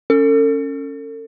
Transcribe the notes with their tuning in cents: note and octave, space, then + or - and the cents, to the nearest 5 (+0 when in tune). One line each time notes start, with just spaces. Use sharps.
C#4 +0 A4 +40